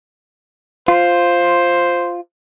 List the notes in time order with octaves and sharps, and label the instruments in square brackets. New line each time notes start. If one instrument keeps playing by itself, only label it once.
[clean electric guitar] F4 [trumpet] C5